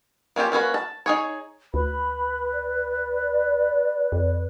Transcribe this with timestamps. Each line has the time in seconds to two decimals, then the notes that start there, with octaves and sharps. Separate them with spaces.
0.36 A#3 C#4 F4 G4
0.52 A#3 C#4 F#4 B4
0.74 A5
1.06 D#4 G#4 C#5
1.74 D2 B4 B5
2.53 D5
4.12 F2